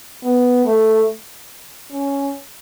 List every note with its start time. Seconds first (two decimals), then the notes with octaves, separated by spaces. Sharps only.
0.23 B3
0.65 A3
1.91 C#4